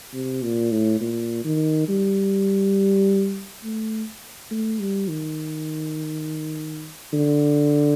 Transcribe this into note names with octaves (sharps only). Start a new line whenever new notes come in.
C3
A#2
A2
A#2
D#3
G3
A3
A3
G3
D#3
D3